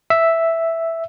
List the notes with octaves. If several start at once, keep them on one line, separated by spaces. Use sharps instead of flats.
E5